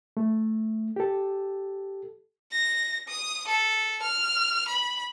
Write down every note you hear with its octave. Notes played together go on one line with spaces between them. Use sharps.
A3
G4 A4
A#6
D#6
A4
F6
B5